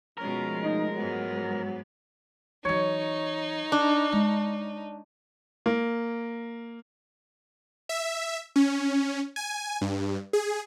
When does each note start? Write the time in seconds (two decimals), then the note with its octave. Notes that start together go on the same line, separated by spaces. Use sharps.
0.18 B2 F3 G#3 A3 C#4 A#4
0.63 D#4
0.96 G#2 F#3 B3
2.65 E3 F#3 D#4 C#5
3.72 D4
4.12 G#3
5.66 A#3
7.89 E5
8.56 C#4
9.36 G#5
9.81 G2
10.33 G#4